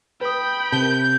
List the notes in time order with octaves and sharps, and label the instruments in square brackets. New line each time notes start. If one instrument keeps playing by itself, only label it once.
[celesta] B4 D#6 [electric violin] G5 B5
[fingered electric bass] C3 [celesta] A#4 A5 [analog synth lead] G6